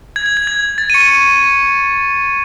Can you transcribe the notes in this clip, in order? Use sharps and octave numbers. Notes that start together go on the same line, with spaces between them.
G#6
G#6
G#6
G#6
A6
D#7
C#6 C#7